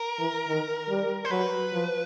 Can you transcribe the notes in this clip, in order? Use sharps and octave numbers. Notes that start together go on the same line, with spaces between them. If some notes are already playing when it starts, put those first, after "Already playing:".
Already playing: A#4
E3
D#3
G3
C5
F#3 B4
F3